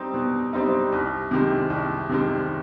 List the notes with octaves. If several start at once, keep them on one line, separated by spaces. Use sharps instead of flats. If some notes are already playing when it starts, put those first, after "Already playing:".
Already playing: G3 C4 D#4
B2
G3 C4 D#4
C2
C3 D#3 G#3
C2
C3 D#3 G#3